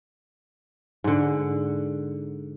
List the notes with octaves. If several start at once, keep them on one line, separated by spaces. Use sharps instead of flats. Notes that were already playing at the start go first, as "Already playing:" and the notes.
G#2 D3